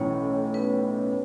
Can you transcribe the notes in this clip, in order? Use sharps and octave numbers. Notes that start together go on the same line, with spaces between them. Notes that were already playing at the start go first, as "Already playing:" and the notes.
Already playing: B1 A2 E3 C#4 C#5
B3 B4